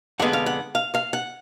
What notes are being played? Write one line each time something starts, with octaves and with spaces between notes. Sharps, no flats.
F2 D3 G#3 B3 F#5
F5
F#5
F5
F5
F#5